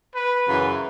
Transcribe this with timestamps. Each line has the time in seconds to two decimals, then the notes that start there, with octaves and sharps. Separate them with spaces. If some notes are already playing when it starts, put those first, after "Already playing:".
0.14 B4
0.45 F#2 C#3 E3